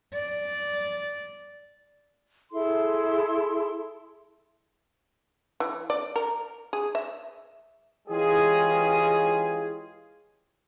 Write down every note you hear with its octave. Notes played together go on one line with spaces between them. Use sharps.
D5
E4 G#4 A4 C6
E3
D5
A#4
G#4
E5
E3 G#3 C#4 F4 G4 G#4